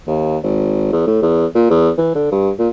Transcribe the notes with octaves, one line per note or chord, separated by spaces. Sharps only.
D#2
G#1
E2
A2
E2
A#2
E2
E3
D3
G2
A#2